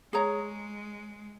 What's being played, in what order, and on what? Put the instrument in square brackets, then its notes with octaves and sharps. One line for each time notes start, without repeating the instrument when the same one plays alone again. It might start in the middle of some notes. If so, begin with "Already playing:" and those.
[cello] G#3 [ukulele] G#4 C#5 A#5